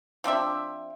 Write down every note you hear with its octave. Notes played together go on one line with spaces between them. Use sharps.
F3 C4 D4 E5